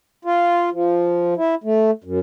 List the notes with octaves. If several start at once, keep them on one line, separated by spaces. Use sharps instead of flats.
F4
F3
E4
A3
F#2